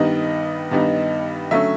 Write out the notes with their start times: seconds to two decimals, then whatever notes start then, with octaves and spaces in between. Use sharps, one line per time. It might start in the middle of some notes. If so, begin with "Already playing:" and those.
Already playing: G2 D#3 G3 B3 D#4 D#5
0.71 G2 D#3 G3 B3 D#4
1.51 D3 F#3 A3 C#4 E5